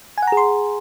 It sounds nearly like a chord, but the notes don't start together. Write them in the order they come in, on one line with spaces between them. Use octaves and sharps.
G#5 F#5 A#5 G#4 C6